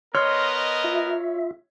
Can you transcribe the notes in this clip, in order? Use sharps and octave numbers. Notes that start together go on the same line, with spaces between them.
B3 A#4 C#5 D#5 C6 F6
F4 E5